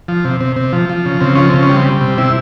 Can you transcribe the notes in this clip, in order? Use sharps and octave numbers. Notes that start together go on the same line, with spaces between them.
F3
C3
C3
C3
F3
F3
C#3
C#3 C4
F3 C#4
C#3 C4
C#4
G3
C4
G3
C3
C3 E4